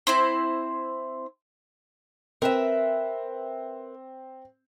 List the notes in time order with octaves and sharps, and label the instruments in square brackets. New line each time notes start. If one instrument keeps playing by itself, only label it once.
[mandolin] C4 E4 C5
[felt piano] C4 [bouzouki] A#4 B4 E5